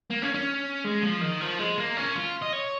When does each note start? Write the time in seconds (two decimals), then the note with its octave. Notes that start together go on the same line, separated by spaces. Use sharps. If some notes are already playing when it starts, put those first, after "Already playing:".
0.10 A#3
0.22 C#4
0.34 C#4
0.85 G#3
1.03 F3
1.21 D#3
1.41 F3
1.59 G#3
1.77 A#3
1.97 C#4
2.15 F4
2.42 D#5
2.53 C#5